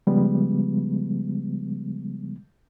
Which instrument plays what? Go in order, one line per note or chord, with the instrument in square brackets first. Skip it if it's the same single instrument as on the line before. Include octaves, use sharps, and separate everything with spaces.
[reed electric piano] C#3 F3 G3 G#3 B3